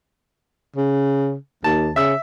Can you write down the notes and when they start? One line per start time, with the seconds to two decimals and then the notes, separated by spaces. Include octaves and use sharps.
0.76 C#3
1.64 D#2 A5
1.96 C#3 E5 E6